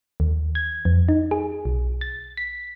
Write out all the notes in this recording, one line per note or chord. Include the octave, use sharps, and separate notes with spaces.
D#2
G#6
F2
D#4
G#4
B1
A6
B6